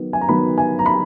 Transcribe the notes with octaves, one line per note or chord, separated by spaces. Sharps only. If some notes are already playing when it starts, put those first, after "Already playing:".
Already playing: D#3 F#3 B3
G#5
A#5
D#3 F#3 B3 B5
G#5
A#5
B5